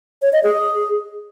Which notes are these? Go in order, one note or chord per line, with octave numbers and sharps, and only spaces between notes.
C#5
D#5
G#4